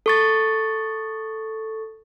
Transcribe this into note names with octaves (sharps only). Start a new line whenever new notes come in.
A4 C#6 A6